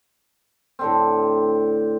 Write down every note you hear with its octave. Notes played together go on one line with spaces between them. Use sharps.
A2 D3 C4